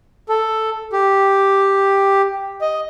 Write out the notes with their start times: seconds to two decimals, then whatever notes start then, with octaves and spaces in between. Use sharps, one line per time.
0.29 A4
0.93 G4
2.61 D#5